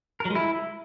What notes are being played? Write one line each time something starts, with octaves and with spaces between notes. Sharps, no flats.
A#4
F#3
G#3
E4